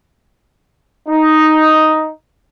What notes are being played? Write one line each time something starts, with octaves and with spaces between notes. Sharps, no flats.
D#4